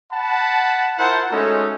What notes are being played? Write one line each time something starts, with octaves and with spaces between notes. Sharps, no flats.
F#5 A5 B5
E4 F4 A#4 C5 F#5 A5
G#3 A3 C#4 D#4 F#4 A4